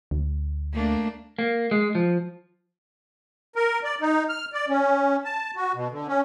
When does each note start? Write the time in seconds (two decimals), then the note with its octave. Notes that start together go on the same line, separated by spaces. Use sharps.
0.11 D2
0.73 A3 A#3 D4
1.39 A#3
1.71 G#3
1.95 F3
3.56 A#4
3.84 D5
4.01 D#4
4.29 F6
4.53 D5
4.68 C#4
5.24 A5
5.56 F#4
5.74 B2
5.91 D3
6.07 C#4